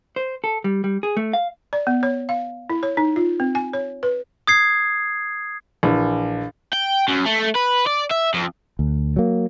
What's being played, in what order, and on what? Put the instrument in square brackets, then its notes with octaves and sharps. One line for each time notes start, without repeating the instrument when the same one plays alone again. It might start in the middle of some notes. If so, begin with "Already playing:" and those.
[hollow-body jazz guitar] C5
A4
G3
G3
G#4
A3
F5
[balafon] D5
B3
C#5
F5
E4
C#5
D#4
F4
C4
G#5
C#5
B4
[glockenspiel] D#6 G#6 C7
[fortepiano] A#1 E3
[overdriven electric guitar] G5
F#2
A3
B4
D5
E5
F2
[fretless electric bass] D2
F#3 A#3